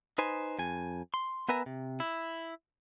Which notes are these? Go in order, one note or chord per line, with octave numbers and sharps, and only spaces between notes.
D#4 B4 C5 G#5
F2 G#5
C6
B3 A#4 B4 E5 G#5 A#5
C3
E4